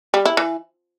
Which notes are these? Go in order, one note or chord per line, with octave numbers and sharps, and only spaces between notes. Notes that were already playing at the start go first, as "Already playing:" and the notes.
G3
E4
E3